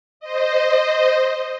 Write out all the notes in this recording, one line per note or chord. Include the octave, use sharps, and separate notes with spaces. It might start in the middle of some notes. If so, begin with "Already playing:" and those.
C5 D#5